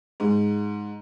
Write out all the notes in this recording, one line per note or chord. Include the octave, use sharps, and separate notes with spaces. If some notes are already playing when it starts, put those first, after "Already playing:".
G#2